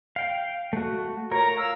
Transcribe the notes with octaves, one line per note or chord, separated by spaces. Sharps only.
F5 G5
A3 F#4
F4 A#4 C#5 A#5
F5 E6